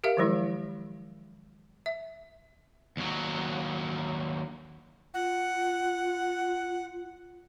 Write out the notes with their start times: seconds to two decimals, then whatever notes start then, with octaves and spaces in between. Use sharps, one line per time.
0.04 G4 A#4 E5 F5
0.17 D#3 F3 F#3 G#3 E4
1.86 E5
2.97 D#2 F#3
5.14 F4 F#5